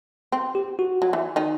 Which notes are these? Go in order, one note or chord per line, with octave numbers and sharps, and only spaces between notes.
C4
G4
F#4
F#3
E3
D#3 D#4